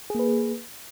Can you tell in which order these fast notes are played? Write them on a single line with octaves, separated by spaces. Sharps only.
G#4 A#3 B4